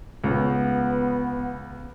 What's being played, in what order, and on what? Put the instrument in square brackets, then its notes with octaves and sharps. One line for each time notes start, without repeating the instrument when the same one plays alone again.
[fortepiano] C#2 [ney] B3